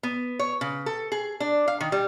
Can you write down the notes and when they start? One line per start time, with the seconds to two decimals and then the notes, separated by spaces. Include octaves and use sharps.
0.03 B3
0.39 C#5
0.61 C#3
0.86 A4
1.12 G#4
1.40 D4
1.68 F5
1.80 D#3
1.92 G3